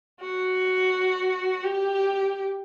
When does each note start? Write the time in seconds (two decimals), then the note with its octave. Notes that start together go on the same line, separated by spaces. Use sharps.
0.21 F#4
1.64 G4